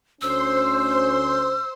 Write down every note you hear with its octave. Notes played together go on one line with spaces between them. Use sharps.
D2 C#4 C5 C6 E6